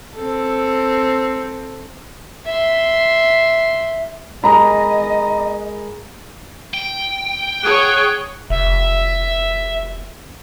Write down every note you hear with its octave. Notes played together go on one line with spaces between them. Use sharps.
C4 A4
E5 C6
G#3 G#4 A#4 D#5 A#5 B5
G5
G#4 C#5 F#5
F1 E5